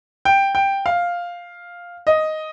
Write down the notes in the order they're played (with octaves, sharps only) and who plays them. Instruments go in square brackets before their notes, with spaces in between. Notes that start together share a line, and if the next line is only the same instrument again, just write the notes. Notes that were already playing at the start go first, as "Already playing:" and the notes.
[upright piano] G5
G5
F5
D#5